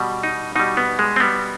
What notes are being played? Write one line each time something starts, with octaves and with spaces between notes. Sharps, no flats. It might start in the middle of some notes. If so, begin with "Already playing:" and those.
Already playing: B2 G3
D#4
B2 G3 D#4
B3
G#3
C4
B2 G3 B3